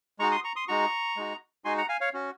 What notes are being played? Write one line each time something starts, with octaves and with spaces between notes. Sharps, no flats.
G#3 D#4 F#4 A#5 C#6
C6 D#6
A#5 C#6
C6 D#6
G#3 D#4 F#4 A#5 C#6
G#3 D#4 F#4
G#3 D#4 F#4 G#5 C6
F#5 A#5
F5 G#5
C#5 F5
C#4 F#4